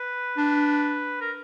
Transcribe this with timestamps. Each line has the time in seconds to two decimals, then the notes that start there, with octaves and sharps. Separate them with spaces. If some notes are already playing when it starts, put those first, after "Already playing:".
Already playing: B4
0.37 D4
1.21 A#4